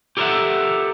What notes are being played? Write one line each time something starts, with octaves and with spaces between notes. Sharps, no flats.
G4 A4 A#4 C5 E5 F#5